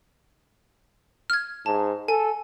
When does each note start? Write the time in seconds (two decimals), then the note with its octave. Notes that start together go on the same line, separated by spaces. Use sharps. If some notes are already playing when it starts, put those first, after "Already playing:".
1.30 F6 G#6
1.66 G#2 A5
2.08 A4 G#5